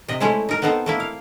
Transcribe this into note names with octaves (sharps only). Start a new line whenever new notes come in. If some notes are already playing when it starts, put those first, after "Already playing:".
C3 D#5
G#3 A3 C#4 E4 C5
D#4 A#4
B3 C4 D#4 A4 C5
A3 A#3 E4
F5